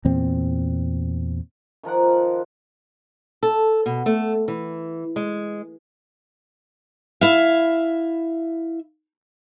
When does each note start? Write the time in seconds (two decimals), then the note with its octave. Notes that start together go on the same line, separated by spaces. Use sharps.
0.05 E2 A#2 C4
1.83 D#3 F3 A#4 F#5
3.43 A4
3.86 B2
4.06 A3
4.48 E3
5.16 G#3
7.21 E4 E5 F5